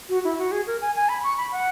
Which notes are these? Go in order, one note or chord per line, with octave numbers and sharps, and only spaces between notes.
F#4
E4
F#4
G#4
A#4
G#5
G#5
B5
C#6
B5
F#5